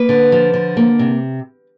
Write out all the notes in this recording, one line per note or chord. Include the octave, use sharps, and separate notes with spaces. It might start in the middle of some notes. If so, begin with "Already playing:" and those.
Already playing: A#3 B4
D3
F3
D3
A#3
C3